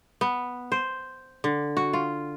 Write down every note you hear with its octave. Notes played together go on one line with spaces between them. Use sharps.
B3
C5
D3
F#4
F4